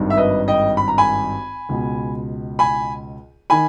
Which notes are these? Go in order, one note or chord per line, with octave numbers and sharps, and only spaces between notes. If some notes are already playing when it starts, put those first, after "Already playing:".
Already playing: G#1 G2 D#3
E5
B4 D#5
D#5 G5
B5
A#5
G#5 B5
C#2 B2
G#5 B5
D#3 G#5 B5